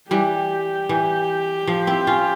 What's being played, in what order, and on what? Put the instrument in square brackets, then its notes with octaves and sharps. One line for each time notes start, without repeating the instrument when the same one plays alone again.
[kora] E3 G3 [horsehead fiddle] G4
[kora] E3
F3
C4 E4
C#4 F4